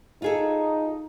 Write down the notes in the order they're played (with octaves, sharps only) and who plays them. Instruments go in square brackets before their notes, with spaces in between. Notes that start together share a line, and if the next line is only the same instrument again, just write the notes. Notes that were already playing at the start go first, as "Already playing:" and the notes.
[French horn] D#4 [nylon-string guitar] F4 G#4 A4